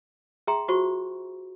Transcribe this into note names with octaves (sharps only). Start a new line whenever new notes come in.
G#4 E5 G5 A#5 C6
F4 F#4 C5 C#6